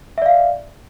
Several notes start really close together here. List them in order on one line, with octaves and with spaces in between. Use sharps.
E5 D5 F5